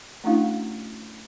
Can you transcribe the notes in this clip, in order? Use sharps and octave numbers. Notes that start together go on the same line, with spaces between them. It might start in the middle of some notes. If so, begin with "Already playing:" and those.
A3 C#4 D4 E4 F#4 F5